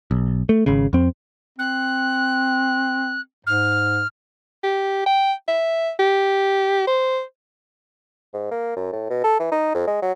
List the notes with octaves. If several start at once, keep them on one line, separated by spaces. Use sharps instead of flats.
B1
A3
G#1 C#3
F2 C4
C4 F#6
G#2 F6
G4
G5
E5
G4
C5
G#2
A#3
F#2
A2
B2
A4
E3
D#4
F2
G#3
F#3